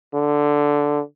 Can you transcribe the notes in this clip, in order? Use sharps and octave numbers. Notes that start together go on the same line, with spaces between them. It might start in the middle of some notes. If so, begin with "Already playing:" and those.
D3